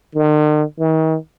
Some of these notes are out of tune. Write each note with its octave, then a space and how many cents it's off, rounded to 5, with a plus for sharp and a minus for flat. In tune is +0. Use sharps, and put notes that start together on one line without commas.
D#3 -45
D#3 +40